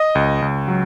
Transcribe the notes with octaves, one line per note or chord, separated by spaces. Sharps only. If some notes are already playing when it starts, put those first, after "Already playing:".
Already playing: D#5
C#2
C#2
F#3